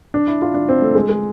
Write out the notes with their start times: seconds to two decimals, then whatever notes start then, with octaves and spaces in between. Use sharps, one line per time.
0.14 D4
0.27 E4
0.42 F4
0.54 D4
0.69 C4
0.82 A3
0.95 G#3
1.09 G#3